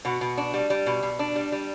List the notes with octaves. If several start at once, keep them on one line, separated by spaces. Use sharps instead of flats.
B2 F#4
B2
D4
G3
G3
B2
B2
D4
G3
G3